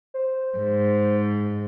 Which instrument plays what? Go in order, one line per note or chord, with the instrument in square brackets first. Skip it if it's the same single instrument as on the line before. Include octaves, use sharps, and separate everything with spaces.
[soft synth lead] C5
[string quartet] G#2